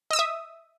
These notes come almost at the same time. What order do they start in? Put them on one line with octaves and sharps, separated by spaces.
D#5 E6 D#6 E5